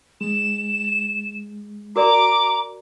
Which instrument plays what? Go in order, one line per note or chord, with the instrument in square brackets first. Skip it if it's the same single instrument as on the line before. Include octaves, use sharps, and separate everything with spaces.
[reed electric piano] G#3 [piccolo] E7
[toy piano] F#4 A#4 D5 [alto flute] A#5 [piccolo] D6